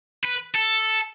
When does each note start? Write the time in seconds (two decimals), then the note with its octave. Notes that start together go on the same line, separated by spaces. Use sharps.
0.24 B4
0.55 A4